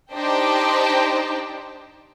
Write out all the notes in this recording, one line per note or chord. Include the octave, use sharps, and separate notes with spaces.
D4 D#4 G4 C5 G5 A5